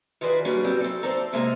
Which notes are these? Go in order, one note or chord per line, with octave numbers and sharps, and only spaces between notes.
D#3 F4 F#4 G#4 B4 D5
F#3 G3 A#3 C#4 D4
F#3 G3 C4
C4 A4
A4 C5 D5 A5 A#5
C3 G#3 A#3 A4 A#4 A#5